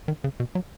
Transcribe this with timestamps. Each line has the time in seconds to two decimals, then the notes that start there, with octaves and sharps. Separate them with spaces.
0.08 D#3
0.24 C#3
0.40 B2
0.55 F#3